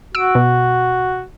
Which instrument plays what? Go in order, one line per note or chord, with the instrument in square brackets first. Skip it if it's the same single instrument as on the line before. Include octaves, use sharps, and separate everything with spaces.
[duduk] F#4 [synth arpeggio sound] E6 D7
[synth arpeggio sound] B2